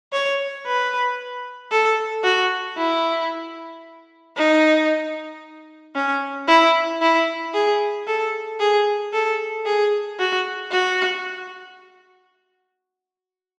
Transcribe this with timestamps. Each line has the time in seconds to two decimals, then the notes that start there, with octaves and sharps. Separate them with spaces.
0.13 C#5
0.66 B4
1.72 A4
2.24 F#4
2.77 E4
4.36 D#4
5.95 C#4
6.48 E4
7.01 E4
7.54 G#4
8.07 A4
8.60 G#4
9.13 A4
9.66 G#4
10.19 F#4
10.72 F#4